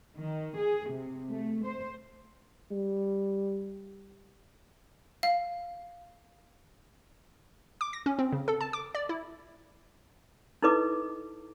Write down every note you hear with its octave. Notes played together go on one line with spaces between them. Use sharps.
D#3
G#4
C3
A3
C5
G3
F5
D6
A#6
C#4
C4
C#3
A4
A5
D6
D5
E4
D#4 E4 A4 B4 D#5 D6